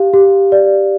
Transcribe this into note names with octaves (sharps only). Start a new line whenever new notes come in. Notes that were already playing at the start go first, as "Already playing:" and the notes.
Already playing: G4 F5
G4
D5